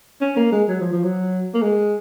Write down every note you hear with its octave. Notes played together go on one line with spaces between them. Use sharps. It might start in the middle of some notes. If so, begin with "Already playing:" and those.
C#4
A#3
G#3
F#3
F3
F3
F#3
A#3
G#3